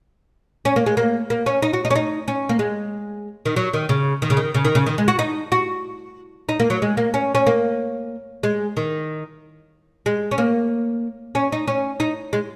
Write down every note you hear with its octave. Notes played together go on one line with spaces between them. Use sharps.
C#4
A#3
G#3
A#3
A#3
C#4
D#4
F#4
D#4
C#4
D#4
C#4
A#3
G#3
D#3
F#3
D#3
C#3
D#3
C#3
D#3
C#3
D#3
C#3
D#3
G#3
F#4
D#4
F#4
D#4
A#3
F#3
G#3
A#3
C#4
C#4
A#3
G#3
D#3
G#3
C#4
A#3
C#4
D#4
C#4
D#4
G#3